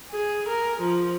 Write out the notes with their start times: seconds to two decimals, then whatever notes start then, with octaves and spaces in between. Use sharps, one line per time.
0.12 G#4
0.49 A#4
0.81 F3